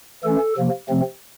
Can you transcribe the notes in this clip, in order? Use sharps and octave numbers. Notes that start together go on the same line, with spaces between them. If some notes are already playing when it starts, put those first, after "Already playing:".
E3 A3 C#4 A4
C3 F3 A#3
C3 F3 A3 C4